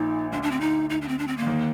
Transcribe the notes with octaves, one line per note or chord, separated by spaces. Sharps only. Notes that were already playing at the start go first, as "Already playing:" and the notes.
Already playing: A#1 A#2 D#4
D2 D3 D4
D4
C4
D#4
D#4
D4
C4
D4
C4
D3 A#3
D#2 D#3